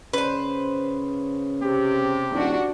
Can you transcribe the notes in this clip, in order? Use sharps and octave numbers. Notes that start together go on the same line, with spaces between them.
C#3 B4 C5
C3 G4
D#1 D4 F#4